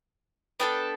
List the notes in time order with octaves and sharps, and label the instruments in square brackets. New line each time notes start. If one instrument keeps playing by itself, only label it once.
[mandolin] B3 D4 A4 G5